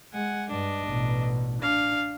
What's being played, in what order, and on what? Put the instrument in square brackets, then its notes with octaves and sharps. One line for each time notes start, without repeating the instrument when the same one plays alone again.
[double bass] G#3 [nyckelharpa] F#5 G#5
[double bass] G2 [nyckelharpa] D4 D#5
[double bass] A1 B2
[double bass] D4 [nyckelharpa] F5